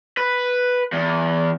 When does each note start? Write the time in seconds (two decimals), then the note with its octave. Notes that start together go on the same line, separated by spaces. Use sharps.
0.18 B4
0.93 E2